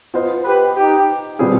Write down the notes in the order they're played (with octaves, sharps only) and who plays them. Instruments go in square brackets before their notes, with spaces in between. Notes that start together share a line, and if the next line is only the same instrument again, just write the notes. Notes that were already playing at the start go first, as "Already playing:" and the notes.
[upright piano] B3 F4 C5 D#5
[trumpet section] G4 B4
D#4 G4
[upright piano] B2 G3 C4 F4 G#4